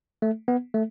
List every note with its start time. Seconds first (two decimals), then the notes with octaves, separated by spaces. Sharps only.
0.22 A3
0.48 B3
0.74 A3